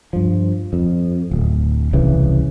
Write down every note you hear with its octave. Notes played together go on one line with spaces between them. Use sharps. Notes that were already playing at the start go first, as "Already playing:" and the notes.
G2 F3
F2
D1
D#1 C2 C#3 E3